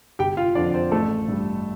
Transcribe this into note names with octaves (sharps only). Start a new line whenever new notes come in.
G1 G4 G5
F4 F5
F2 D3 F3 D4 D5
C4 C5
A1 A3 A4
G2 G3